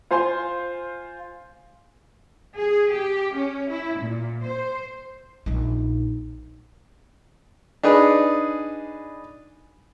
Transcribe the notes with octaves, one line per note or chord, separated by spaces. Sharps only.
F4 C5 F5 G#5 C6
G#4
G4
C#4
E4
A#2
C5
A#1 D#4
D4 D#4 G#4 B4